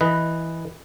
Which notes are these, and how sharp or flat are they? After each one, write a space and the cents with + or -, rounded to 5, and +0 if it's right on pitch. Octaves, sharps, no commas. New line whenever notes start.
E3 +0 B4 +0 D#5 +0